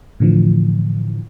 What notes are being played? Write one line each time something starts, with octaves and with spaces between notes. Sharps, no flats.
A2 D3 E3 F3